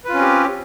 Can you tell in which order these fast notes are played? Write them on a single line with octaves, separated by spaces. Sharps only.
B4 F4 C#4 C4 G4